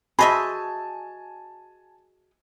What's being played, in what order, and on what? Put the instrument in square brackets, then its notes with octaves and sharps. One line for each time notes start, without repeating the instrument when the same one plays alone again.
[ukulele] F#4 G#4 [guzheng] C5 D#5 E5 [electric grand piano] G#5 A5 [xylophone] B5